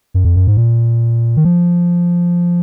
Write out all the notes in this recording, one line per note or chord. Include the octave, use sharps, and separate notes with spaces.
F#2
F2
F#2
G#2
A#2
D#3
F3